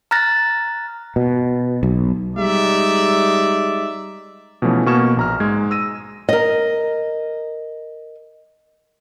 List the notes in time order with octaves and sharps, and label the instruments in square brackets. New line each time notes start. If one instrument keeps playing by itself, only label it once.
[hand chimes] A#5 F6 F#6 A6 A#6
[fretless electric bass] B2
B1
[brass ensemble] G3 G#3 D#4 D5 E5
[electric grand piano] B2 E3 F3 A3 C#4
B2 A#3 C#6 F6 G#6 E7
A#1 A#5 F6
G#2 G#3 G#6
E6 A#6 D#7
[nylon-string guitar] A#4 D#5